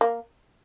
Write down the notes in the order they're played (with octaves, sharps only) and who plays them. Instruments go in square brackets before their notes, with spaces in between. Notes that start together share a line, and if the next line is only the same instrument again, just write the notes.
[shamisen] A#3